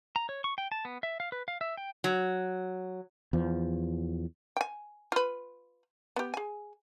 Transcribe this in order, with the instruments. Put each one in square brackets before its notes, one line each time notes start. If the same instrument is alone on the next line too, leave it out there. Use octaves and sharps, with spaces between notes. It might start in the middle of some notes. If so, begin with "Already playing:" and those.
[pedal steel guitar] A#5
C#5
C#6
G5
A5
B3
E5
F5
B4
F5
E5
G5
[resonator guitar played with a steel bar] F#3
[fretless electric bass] E2 F3
[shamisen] G5 G#5
F4 B4
B3 G4
G#4 G#5